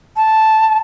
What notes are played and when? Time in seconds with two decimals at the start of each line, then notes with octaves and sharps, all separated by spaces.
0.17 A5